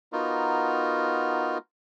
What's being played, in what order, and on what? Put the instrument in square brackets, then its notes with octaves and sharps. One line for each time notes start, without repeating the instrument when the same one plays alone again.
[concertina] B3 D#4 F4 F#4 A#4